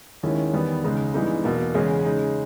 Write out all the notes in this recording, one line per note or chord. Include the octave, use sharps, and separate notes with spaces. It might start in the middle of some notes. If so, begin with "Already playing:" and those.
D#2 D#3 G#3 C#4 E4
E2 D#3 G3 B3
C#2 C#3 G#3 D#4
G2 E3 G#3 B3 D#4
E2 B2 A#3
E2 C#3 G#3 C#4
C#3 G#3 D#4